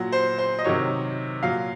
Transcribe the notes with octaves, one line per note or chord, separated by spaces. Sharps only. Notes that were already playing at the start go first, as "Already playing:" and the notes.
Already playing: A#2 F#3 F#5
C5
C5
D#5
C3 D#3 F#3 C#5
A#2 F#3 F5